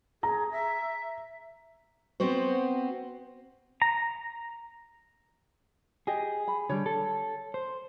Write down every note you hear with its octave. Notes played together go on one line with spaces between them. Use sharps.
G#4 A#5
E5
B3 C4 F#4 C5
A#5
G4 G#4 D#5
B5
D3 G3 C#5
A4
C5